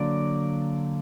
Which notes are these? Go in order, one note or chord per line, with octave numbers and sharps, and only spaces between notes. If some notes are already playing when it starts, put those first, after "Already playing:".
Already playing: D3 F#3 A#3 D5